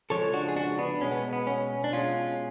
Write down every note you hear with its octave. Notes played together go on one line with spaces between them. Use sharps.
C#3 F3 G#3 A4 C#5
D4 F#4
G#4
D4 F#4
B3 D4
B2 G#3 C#4
B3
B3
C#4
D4
B2 G#3 C#4 F4